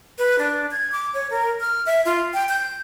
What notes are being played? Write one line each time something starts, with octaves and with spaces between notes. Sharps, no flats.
B4
D4
G#6
D6
C#5
A#4
F6
E5
F4
G5
G6